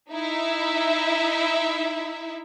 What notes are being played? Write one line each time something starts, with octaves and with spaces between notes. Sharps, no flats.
D#4 E4 E5